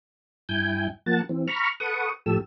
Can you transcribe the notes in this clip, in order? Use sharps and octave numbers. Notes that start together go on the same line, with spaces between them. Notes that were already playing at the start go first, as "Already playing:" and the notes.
G2 E4 G5 G#5 G6
F3 A#3 F#5 A5 A6
E3 C4
A#5 B5 C#6 F6
A4 B4 F#5 C#6 D#6
A2 F3 G4 A4 E6